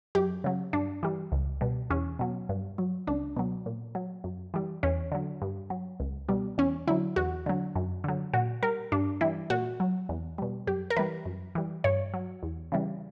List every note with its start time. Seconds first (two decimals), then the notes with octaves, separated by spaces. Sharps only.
0.15 F#2 G4
0.44 C#3 F#3
0.73 G2 D4
1.03 E3 G3
1.32 C#2
1.61 B2 G3
1.90 E2 C#4
2.19 B2 F#3
2.49 G2
2.78 F#3
3.07 C#2 D4
3.37 B2 F#3
3.66 A#2
3.95 F#3
4.24 F#2
4.54 E3 G3
4.83 E2 C#4
5.12 D3 F#3
5.42 G2
5.70 F#3
6.00 C#2
6.29 B2 G3
6.58 E2 C#4
6.88 D3 F#3 E4
7.16 E2 F#4
7.46 D3 F#3
7.75 F#2
8.04 D3 F#3
8.33 A#2 F#4
8.63 G3 A#4
8.92 G2 D4
9.21 E3 G3 E4
9.50 A#2 F#4
9.80 F#3
10.09 E2
10.38 B2 G3
10.67 F#2 G4
10.90 A#4
10.97 E3 G3 B4
11.26 F#2
11.55 E3 G3
11.84 G2 C#5
12.14 F#3
12.43 E2
12.72 C#3 E3 G3